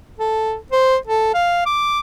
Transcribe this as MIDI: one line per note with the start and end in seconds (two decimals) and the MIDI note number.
0.19 0.55 69
0.72 0.96 72
1.07 1.33 69
1.34 1.64 77
1.66 2.00 86